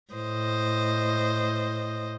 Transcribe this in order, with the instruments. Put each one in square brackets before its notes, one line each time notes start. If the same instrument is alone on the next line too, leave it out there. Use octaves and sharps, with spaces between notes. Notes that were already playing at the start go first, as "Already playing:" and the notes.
[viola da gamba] A2 C5 D#5